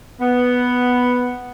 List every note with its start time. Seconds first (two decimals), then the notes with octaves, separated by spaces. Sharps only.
0.20 B3